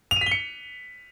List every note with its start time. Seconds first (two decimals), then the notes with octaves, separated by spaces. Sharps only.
0.11 F7
0.16 D#7
0.21 B6
0.26 G7
0.31 C#7